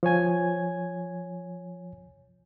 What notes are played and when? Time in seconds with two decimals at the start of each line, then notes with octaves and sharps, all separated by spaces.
0.03 F3 C#5 G#5 G#6